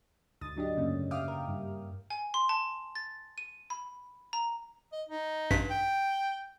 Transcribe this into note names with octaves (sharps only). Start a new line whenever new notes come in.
D2 G#2 D3 D#6 A6
F#3 D4 G4 D#5
F#2 C#3 A3 A#3 C#4
E5 F5 G5 D6 D#6 F6
A#4
G2 G3
G#5
C6
A5
A6
D#7
B5
A#5
D#5
D#4
A1 G2 B6
G5